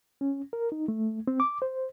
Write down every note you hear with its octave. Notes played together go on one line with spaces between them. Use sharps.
C#4
A#4
D#4
A3
C4
D6
C5